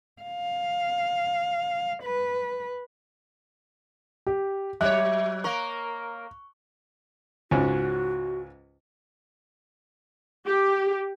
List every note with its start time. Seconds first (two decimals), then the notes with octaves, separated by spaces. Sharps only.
0.22 F5
2.03 B4
4.27 G4
4.81 F#3 C#5 E5 F#6
5.44 A#3 A#4 C#6
7.51 C#2 G#2 C#4 F#4
10.47 G4